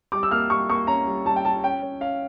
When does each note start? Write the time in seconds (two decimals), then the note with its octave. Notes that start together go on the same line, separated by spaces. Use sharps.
0.12 G3 D6
0.23 E6
0.31 A#3 F6
0.50 G3 C#6
0.69 A#3 C#6
0.87 C#4 A#5
1.07 G3
1.25 G3 A5
1.36 G5
1.45 G3 A5
1.64 C#4 G5
1.82 C#4
2.01 C#4 F5